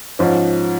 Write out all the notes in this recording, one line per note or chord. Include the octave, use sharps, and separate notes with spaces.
G#2 F3 C#4